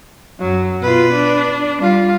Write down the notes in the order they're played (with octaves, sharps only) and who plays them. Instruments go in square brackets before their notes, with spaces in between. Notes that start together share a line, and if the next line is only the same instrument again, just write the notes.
[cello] F#2 [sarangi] F#3
[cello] B2 F4 [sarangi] B4
[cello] D4
[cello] G3 [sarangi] F4